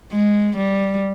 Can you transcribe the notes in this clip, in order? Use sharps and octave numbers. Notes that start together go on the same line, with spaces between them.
G#3
G3